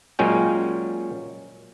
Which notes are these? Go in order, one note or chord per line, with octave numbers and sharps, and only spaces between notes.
A#2 F#3 G#3 C#4 G5